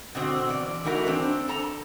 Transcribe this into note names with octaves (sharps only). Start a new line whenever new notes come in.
B2 D3 C4 F#4
E2 D5
E3 A3 D#4 F#4 A#4
C4 D4
A4 A#5